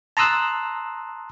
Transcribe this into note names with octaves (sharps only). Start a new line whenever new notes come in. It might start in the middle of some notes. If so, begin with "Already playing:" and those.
A5 A#5 C6 D#6 E6 F#6